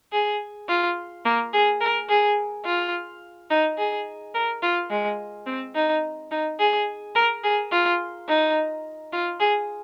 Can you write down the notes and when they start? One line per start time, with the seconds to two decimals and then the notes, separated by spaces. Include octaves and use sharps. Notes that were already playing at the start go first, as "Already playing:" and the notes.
0.12 G#4
0.69 F4
1.25 A#3
1.54 G#4
1.81 A#4
2.09 G#4
2.66 F4
3.50 D#4
3.78 G#4
4.35 A#4
4.63 F4
4.90 G#3
5.47 C4
5.76 D#4
6.31 D#4
6.60 G#4
7.16 A#4
7.44 G#4
7.72 F4
8.28 D#4
9.13 F4
9.40 G#4